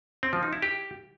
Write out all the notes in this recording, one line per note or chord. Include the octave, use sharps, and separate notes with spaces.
C4
F3
D#4
E4
G4